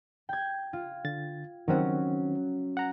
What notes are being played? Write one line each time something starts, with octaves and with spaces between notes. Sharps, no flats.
G5 G#6
F4
D3 A6
D#3 F#3 C4 C#4 F#4
F#5 A#5